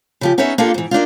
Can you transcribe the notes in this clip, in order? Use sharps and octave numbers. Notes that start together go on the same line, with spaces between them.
C#3 F3 G4
B3 C#4 D#4 G#4 C#5 E5
A#3 D4 F4 G4 A4
G#2 E3
A#3 D4 D#4 F4